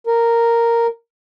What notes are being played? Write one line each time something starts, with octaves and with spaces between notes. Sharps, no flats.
A#4